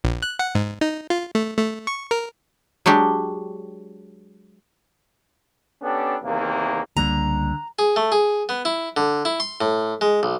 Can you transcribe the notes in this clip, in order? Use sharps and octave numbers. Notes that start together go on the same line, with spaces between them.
A#1
F#6
F#5
G#2
D#4
F4
A3
A3
C#6
A#4
F#3 G#3 D4 G4
B3 C#4 D4 G4 A4
E2 C3 D#3 A#3
C#2 D3 G3 A#3 A#5
G#4
A3
G#4
B3
E4
D3
E4
C6
A2
G#3
B1